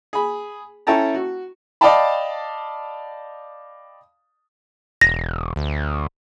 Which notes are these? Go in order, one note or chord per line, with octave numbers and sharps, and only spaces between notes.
G#4 B5
C#4 E4 A4 G5 A5 A#5
F#4
D5 D#5 F5 G5 A5 B5
E1 A#6
D2